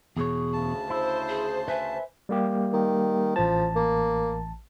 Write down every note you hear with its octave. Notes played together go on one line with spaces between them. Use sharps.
E2 B2 G#4 C#5
D2 C#3 A5
E4 C5
G#4
B4 E5 G#5
G3 A#3 G4
D#3
A1 F3 A5
A#3